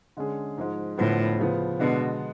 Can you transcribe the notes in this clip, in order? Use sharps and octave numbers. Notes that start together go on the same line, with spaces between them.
D3 G#3 C#4 G#4
G#2 F3 G#3
D2 A2 D3 F3 B3
C#3 F3 B3
B2 D3 G#3 B3 D4